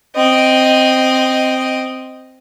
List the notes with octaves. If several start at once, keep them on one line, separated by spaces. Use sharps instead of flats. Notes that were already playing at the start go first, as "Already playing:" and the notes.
C4 D#5